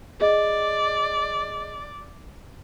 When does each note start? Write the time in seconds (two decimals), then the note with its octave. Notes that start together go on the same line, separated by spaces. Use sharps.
0.21 G#4 D5 D#5